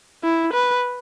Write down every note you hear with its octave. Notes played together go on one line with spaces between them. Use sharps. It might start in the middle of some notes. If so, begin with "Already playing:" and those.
E4
B4